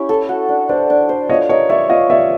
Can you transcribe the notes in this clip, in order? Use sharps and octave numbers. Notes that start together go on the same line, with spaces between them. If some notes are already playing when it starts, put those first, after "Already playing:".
Already playing: C#4 E4 G4
A4
F#4
D4
D4 C5 D5
D4
C5
F4 C#5 D#5
A#4 C#5 D#5
C#5 D5 E5
F4 D#5 F5
C#5 D5 E5